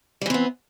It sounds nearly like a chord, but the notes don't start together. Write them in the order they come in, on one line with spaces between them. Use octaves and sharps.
G3 E3 C4 B3